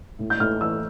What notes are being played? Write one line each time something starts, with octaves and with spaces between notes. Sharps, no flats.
A2
G6
A2 F6
E3 E6